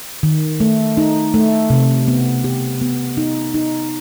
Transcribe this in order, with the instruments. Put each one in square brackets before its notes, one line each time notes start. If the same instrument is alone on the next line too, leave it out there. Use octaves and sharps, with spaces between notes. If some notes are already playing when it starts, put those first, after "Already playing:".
[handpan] D#3
A3
D#4
A3
C3
B3
G4
B3
D#4
D#4